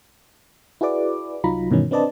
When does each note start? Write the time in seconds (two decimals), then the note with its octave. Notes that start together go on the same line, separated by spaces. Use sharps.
0.81 E4 F#4 G#4 B4 D5 D6
1.44 C2 F#3 D#4 F4 A#5 B5
1.71 G2 B2 D#3 E3 C#4
1.91 C4 D4 B4 D5 D#5 A5